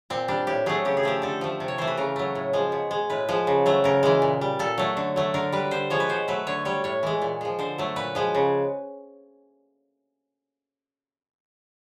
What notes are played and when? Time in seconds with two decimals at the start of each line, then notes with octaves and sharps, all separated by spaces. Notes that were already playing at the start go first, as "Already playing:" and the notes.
0.10 A#2 C4
0.28 G3 D4
0.47 A2 G4
0.66 F#3 A3 G#4
0.85 C#3 G4
0.97 G#4
1.03 F3 A3 G4
1.22 D3 A4
1.41 F3 A3
1.60 C3
1.68 C#5
1.78 E3 A3 C5
1.87 B4
1.97 C#3 A#4
2.16 F#3 A3
2.35 A2
2.53 F3 G#3
2.72 B2
2.91 G#3
3.10 A2 B4
3.29 F3 G#3
3.47 C#3
3.66 F#3 A3
3.84 C#3 A#4
4.03 E3 G#3
4.22 A#2
4.41 G3
4.59 A#2 A4
4.78 F#3 A3
4.97 D3
5.16 F#3 A3
5.34 D3 A#4
5.52 G3 B4
5.71 D3 C5
5.90 F3 G#3 C#5
6.00 B4
6.09 B2 C5
6.28 F#3 A3 B4
6.47 D3 C#5
6.65 G3 C#5
6.84 A2 C#5
7.03 E3 G#3
7.22 A#2
7.41 F3 G#3
7.59 D3 C5
7.78 F#3 A3
7.96 A#2 B4
8.15 F3 G#3
8.35 C#3